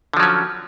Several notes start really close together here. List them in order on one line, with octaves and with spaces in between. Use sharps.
D3 F3 F#3 C#4